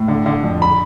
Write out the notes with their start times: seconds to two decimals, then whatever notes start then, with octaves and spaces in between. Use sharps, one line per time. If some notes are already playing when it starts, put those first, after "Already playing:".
Already playing: A2
0.08 D3
0.26 D3
0.44 F2
0.62 B5